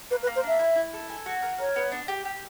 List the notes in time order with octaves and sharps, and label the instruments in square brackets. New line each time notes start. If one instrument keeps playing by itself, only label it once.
[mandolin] A#3 [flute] B4
[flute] B4
[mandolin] A#3
[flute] C5
[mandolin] D4 [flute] E5
[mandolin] E4
E4
A4
G#5
F#4
A#4
[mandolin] A#4 [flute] C#5
[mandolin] B3
D4
G4
G4